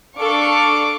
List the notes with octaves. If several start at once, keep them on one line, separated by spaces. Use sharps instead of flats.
D4 A4 F5 C#6 D6